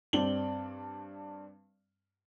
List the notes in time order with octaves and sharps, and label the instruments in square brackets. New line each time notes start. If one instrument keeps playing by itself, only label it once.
[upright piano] G2 C4 D4 F#7 G7